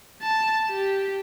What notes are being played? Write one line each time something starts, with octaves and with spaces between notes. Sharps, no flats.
A5
G4